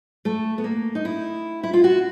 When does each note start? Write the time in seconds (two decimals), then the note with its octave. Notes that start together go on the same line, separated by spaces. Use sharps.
0.25 A3
0.58 B3
0.64 A#3
0.95 D#4
1.05 E4
1.63 E4
1.73 F4
1.84 F#4